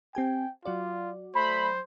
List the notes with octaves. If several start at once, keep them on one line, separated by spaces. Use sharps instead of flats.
C4 G4 G5 G#5
F#3 F4 F#4 D5
A3 C5 B5